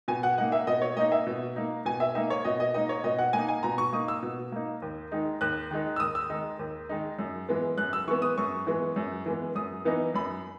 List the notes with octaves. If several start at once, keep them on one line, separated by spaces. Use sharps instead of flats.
B2 G#5
F#5
A#3 D#4 F#5
E5
B2 D#5
C#5
A#3 D#4 D#5
E5
B2
A#3 D#4
B2 G#5
E5
A#3 D#4 E5
C#5
B2 D#5
D#5
A#3 D#4 D#5
C#5
B2 D#5
F#5
A#3 G#5
D#4
G#5
B2 A#5
C#6
A#3 D#4 D#6
E6
B2
A#3 D#4
D#2
D#3 G#3 D#4
D#2 F#6
D#3 G#3 D#4
E6
D#2 D#6
E6
D#3 G#3 D#4
D#2
D#3 G#3 D#4
F#2
E3 G#3 B3
F#2 F#6
E6
E3 G#3 B3 C#6
D#6
F#2 C#6
E3 G#3 B3
F#2
E3 G#3 B3
F#2 D#6
E3 B3 D#4
F#2 B5